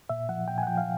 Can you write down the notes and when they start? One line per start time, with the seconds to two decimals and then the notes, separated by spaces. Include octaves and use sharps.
0.09 A#2 E5
0.29 F3 F#5
0.48 A#2 G5
0.58 F#5 G#5
0.67 F3 G5
0.77 F5